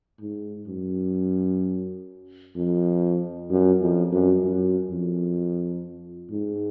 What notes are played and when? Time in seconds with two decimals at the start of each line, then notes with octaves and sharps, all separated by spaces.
0.21 G#2
0.68 F#2
2.56 F2
3.50 F#2
3.82 F2
4.12 F#2
4.44 F#2
4.91 F2
6.32 G#2